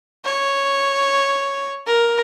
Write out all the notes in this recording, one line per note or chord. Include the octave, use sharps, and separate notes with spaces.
C#5
A#4